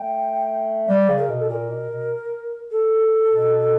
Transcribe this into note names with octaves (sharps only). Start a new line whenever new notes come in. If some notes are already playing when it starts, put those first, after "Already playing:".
Already playing: A3 G5
G3 D5
C#3
A#4
B2
A4
A#2 A#4
B2
B2
A4
B2